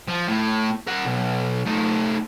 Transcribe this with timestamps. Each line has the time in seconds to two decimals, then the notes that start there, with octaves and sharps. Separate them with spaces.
0.08 F3
0.28 A2
0.88 A#4 F#5
1.06 B1
1.66 A3 D#4